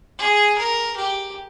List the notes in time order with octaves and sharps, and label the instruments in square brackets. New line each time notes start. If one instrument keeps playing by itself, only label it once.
[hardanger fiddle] G#4
A#4
G4